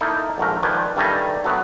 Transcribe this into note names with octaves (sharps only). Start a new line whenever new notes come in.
A#3 D#4 E4 A4
A#1 G#2 A3 A#4
D#3 F3 B4 D5 G#5
G2 D#3 G3 A3 G#5 A#5
F#3 A3 B3 D4